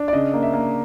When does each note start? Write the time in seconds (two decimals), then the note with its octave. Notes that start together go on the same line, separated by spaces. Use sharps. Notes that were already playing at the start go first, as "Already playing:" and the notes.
Already playing: D4
0.08 D5
0.13 C#3 D#5
0.34 A#3
0.43 E5
0.53 A#3